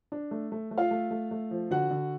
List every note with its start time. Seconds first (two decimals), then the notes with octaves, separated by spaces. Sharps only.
0.12 D4
0.31 A3
0.52 A3
0.71 A3
0.78 F4 F5
0.91 A3
1.11 A3
1.31 A3
1.51 F3
1.71 D3 F#4 F#5
1.91 D3